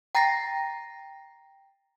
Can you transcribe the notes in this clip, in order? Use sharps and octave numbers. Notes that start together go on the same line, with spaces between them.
G5 A#5 A6 A#6 C7